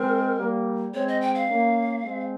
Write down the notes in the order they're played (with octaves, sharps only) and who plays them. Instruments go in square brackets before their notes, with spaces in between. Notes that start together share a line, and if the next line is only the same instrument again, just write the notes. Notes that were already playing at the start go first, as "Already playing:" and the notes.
Already playing: [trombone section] G#3 C4 [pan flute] A#4
[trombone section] G3 A#3
[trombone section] G#3 C4 [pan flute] C#5
[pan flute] D#5
G5
F5
[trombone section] A#3 C#4
G#3 C4